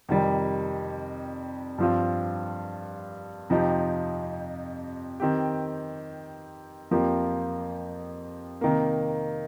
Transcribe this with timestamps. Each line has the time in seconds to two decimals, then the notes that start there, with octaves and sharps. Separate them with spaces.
0.09 F2 C3 D#3 G3
1.78 G2 F3 C4 F4
3.50 F2 C3 F3 D#4 G4
5.20 D#3 C4 G4
6.91 F2 F3 A#3 G4
8.61 C3 D#3 A#3